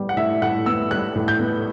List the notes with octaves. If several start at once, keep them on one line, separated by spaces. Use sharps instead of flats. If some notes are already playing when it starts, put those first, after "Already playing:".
Already playing: A2 G3 B3
F#5
A2 E5
A2 F#5
B3 E6
G3 F#6
A2
G6
B3